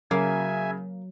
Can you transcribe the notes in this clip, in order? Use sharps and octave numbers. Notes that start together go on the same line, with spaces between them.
C#3 F#3 A#3 E5 G#5